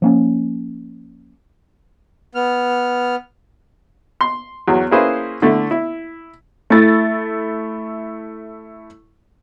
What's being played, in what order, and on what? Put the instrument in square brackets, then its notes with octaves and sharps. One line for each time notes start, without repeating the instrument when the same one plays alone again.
[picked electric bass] F3 A#3 C#4
[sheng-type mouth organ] B3 F6
[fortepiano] C6
E2 F#3
A#3 C#4 E4 G#4 B4 C5
D3 A3 E4
E4
[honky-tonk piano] A3 E4 A6